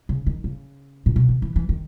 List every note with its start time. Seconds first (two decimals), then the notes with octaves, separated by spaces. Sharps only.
0.09 C#3
0.26 D#3
0.44 C#3
1.06 A#2
1.16 B2
1.29 D#3
1.42 E3
1.56 E3
1.69 D#3